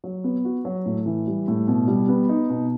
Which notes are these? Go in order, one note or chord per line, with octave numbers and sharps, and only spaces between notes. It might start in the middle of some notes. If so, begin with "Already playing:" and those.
F#3
B3
F#4
F#3
A2
E3
G3
A2
B2
G3
B3
D#4
B2